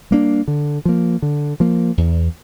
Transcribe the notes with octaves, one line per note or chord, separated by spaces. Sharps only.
G3 A#3 D4
D3
F3 A#3
D3
F3 A#3
E2